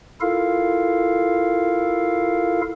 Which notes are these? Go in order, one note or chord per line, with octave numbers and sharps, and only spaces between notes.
E4 F4 A4 A#4 F5